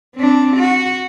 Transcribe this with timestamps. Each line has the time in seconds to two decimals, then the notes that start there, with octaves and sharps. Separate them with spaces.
0.15 C4 D4
0.57 F#4